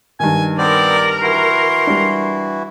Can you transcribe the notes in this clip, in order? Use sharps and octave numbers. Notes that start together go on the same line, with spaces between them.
G2 D#3 G#5
B3 C4 A#4 C5 D5
E3 E4 F#4 C6
G3 D4